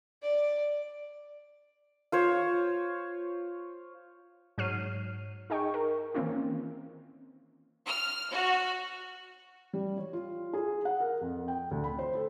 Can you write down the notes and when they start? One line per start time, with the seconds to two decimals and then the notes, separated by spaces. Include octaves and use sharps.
0.23 D5
2.12 F4 C5 C#5
4.58 G#2 F#3 C#5 F6 C7 D#7
5.50 D#4 G#4 D#5 G5 C#6
5.74 A#4
6.14 D#3 E3 A#3 C4 C#4 F4
7.88 F6
8.33 F#4
9.73 G3
9.98 C#5
10.13 F4
10.53 G#4
10.85 F#5
11.00 A#4
11.21 F2
11.48 G5
11.71 D2
11.84 B5
11.99 C5
12.15 A4